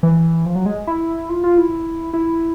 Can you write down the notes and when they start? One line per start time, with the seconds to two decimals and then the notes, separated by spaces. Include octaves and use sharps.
0.03 E3
0.46 F3
0.55 F#3
0.66 G#3
0.87 E4
1.29 F4
1.44 F4
1.58 E4
2.13 E4